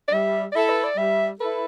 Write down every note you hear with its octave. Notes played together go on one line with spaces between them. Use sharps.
D5
G3 E5
D5
E4 A4 E5
B4
D5
G3 E5
E4 A4 B4